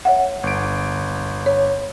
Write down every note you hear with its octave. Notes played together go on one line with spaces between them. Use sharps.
C#5 E5 F#5
G1 D7
C#5